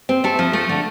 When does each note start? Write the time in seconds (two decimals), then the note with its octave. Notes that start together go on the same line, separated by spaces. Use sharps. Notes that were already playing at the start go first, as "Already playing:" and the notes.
0.09 C4
0.24 A3 A4
0.39 F3
0.53 A3
0.69 D3